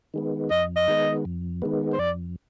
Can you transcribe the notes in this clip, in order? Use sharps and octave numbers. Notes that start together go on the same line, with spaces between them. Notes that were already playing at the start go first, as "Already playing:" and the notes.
D#3 G#3 B3
F2 D#5
D#5
D#3 G#3 B3
F2
D#3 G#3 B3
C5
F2 D5